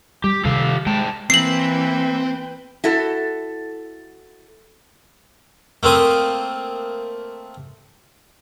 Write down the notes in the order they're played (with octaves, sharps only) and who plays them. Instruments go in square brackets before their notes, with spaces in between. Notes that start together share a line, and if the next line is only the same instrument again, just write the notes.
[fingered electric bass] G3 [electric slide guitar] G4
[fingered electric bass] C3 D#3 G3 [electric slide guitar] G4 A4 F5
[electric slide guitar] G#2 G5 A5 [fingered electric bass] G#3
[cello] E3 A#3 [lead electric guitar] C4 [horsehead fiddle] B4 G5 [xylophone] C7 F#7
[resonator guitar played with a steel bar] E4 F#4 A4
[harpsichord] A3 A#3 C4 D#6